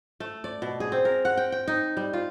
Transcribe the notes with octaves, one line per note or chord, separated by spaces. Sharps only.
A3
D5
B2
G#4
C4
A#4
F#5
G5
G5
D#4
G3
F4